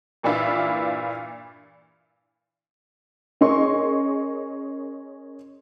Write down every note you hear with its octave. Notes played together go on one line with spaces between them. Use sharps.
G2 A#2 E3 D4 E4 F4
C#4 G#4 A#4 D#5 C6 C#6